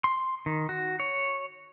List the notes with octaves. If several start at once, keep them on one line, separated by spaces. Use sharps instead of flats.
C6
D#3
F#4
C#5